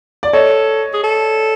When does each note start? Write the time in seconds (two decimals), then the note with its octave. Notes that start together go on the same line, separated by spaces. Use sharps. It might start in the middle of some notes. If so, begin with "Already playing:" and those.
0.23 D5
0.33 A4 C#5 D#5
0.93 G#4
1.03 A4